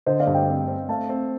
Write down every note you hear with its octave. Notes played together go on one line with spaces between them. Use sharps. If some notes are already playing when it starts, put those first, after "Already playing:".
D3 C5 D#5
D5 F5
G2
D#5 G5
C4
C4
A3 F5 A5
C4